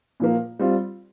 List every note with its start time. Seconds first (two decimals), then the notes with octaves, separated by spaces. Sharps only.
0.20 A#2 F3 A#3
0.59 G3 C4 F4